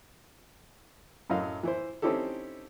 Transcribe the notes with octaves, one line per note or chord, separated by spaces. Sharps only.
F#2 A2 F#3 D#5 F5
E3 E4 C5
C4 C#4 D#4 E4 G4 A4